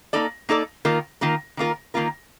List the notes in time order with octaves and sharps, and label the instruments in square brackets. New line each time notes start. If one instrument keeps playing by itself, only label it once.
[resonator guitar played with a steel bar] A#3 D#4 A4 D5
A#3 D#4 A4 D5
D#3 A#3 F4 A#4
D#3 A#3 F4 A#4
D#3 A#3 F4 A#4
D#3 A#3 F4 A#4